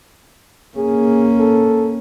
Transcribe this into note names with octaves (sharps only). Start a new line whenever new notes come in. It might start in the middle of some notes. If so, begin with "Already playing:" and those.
A#3 C#4 G#4
A4